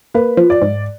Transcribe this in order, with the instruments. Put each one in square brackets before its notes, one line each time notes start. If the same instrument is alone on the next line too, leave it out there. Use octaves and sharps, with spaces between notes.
[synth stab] A#3 [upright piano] B4
[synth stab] F3
[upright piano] D5
[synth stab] G#2